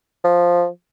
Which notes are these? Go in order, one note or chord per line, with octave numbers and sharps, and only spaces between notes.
F3